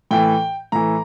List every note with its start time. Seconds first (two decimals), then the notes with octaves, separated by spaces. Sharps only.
0.11 A2 E3 G5
0.72 A2 E3 A#5